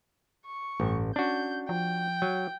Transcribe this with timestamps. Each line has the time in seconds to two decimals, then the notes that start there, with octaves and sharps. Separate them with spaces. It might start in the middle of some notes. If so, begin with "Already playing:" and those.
0.46 C#6
0.80 A1 G2
1.16 C#4 D4 F#4 G6
1.69 F3 G5
2.22 F#3